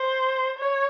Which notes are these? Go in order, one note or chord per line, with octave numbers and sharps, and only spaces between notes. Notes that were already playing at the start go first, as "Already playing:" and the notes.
Already playing: C5
C#5